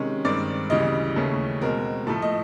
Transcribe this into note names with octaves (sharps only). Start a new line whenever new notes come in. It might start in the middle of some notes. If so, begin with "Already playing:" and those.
Already playing: C3 D#3 G#3 C#4
G2 D#3 G#3 C4 D5
D2 C#3 E3 G3 D#5
D#2 C#3 E3 A3 C#4
B2 G#3 C4 A#4
A2 F3 A3 A4
D#5